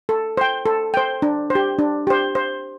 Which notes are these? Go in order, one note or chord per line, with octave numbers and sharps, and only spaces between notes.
A4
C5 G5
A4
C5 G5
D4
C5
G4
D4
G4 C5
C5